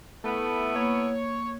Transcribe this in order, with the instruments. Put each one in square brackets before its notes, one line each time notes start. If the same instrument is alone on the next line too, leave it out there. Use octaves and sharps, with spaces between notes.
[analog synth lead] A3 [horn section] B3 E4 A4
[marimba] A#3 [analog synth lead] C#5